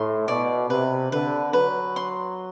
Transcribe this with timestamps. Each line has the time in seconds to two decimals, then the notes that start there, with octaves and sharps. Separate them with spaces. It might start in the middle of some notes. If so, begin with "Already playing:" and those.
Already playing: A2 C6
0.28 B2 D5
0.70 C3 B4
1.12 D3 B4
1.53 F#3 B4
1.96 C6